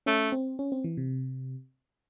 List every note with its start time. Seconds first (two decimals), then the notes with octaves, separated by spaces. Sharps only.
0.06 A3 C#4
0.32 C4
0.59 C#4
0.72 C4
0.84 E3
0.97 C3